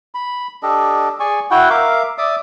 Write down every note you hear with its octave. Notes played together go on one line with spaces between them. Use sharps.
B5
D4 G4 A4 D#5
G#4 D5 G#5 C#6
E4 F#4 F#5 G5
A#4 E5 F5 D6
D5 E5 D6 D#6